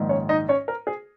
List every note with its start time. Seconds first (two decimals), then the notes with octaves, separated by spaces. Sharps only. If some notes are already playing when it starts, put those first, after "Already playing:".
Already playing: A#1 G#2 D#3
0.09 C#4 C#5
0.29 D#4 D#5
0.49 C#4 C#5
0.68 A#4
0.87 G#4